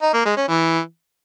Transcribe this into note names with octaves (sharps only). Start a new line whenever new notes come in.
D#4
A#3
G#3
C#4
E3